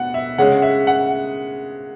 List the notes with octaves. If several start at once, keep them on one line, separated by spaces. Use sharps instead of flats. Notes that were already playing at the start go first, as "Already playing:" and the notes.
Already playing: B2 F#5
E5
C#3 G#3 C#4 F#5
E5
F#5